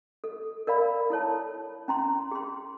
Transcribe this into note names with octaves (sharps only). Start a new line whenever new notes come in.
A4
A#4 D5 F5 B5
E4 A4 C#5 A5
C#4 A#5 C6
G#4 C6